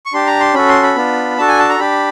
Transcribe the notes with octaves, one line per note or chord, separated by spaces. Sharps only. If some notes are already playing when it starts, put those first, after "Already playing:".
C#6
D4 G4 C6
A#5
C6
C#4 F#4 A4 B5
C6
B5
B3 D4 F4
D4 F#4 A4 A5
G#5
A5
A#5
D4 G4 B5